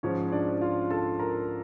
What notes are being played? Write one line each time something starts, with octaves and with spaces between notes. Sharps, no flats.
G#2 F3 C#4 C#5
D4 D5
F4 F5
A4 A5
A#4 A#5